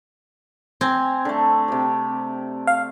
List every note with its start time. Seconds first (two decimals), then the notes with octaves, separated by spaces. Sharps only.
0.81 C4 G#5 A#5
1.25 D3 A3
1.68 C3 G4
2.67 F5